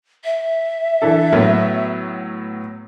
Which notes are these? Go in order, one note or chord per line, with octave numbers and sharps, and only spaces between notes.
E5
E3 D4 A4
A2 F#3 B3